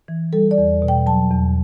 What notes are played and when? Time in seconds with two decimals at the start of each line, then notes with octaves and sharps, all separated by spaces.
0.08 E3
0.33 G3 A4
0.51 D5
0.58 E2
0.82 B2
0.88 G5
1.06 F#3 A5
1.31 E2